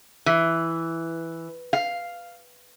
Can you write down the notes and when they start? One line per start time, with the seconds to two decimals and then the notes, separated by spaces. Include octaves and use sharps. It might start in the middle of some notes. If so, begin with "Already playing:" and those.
0.26 E3
1.73 F5